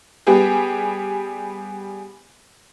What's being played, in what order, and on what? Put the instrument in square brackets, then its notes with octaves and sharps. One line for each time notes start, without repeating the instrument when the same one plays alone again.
[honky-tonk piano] G3 B3 G4 G#4